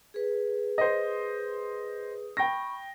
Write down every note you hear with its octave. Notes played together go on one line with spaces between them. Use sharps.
G#4 B4
C5 D#5
G5 B5 C#6 A#6